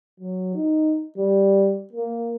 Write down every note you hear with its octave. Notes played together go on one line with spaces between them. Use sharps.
F#3
D#4
G3
A#3